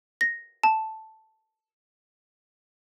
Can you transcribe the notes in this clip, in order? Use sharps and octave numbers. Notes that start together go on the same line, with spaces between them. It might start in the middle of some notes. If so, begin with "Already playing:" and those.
A#6
A5